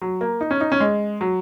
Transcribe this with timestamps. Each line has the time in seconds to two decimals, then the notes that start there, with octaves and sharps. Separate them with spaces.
0.02 F#3
0.21 A#3
0.41 D#4
0.51 C#4
0.61 D#4
0.72 C#4
0.80 G#3
1.21 F#3